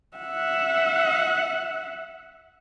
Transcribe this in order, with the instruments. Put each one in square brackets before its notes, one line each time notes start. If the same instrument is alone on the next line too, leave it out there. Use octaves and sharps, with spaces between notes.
[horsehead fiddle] E5 F#5